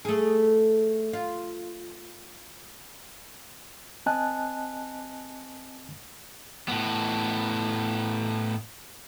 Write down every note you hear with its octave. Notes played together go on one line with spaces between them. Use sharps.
A3 G#4
F4
C4 D#5 G#5 A5 F#6
A2 B3